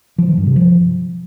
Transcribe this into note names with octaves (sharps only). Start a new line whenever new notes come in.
F3
D#3
G2
C3
F3